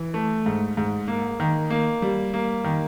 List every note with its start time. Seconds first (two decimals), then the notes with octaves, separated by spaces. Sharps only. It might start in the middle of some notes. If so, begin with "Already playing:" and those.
Already playing: E3
0.14 A3
0.46 G#2
0.77 G#2
1.08 A#3
1.40 D#3
1.70 A#3
2.02 G3
2.34 A#3
2.64 D#3